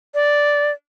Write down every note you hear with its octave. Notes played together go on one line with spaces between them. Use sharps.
D5